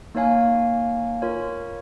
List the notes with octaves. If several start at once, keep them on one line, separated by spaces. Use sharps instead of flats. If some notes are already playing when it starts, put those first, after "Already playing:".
A#3 D#4 C#5 F5 G#5
F4 A#4 C#5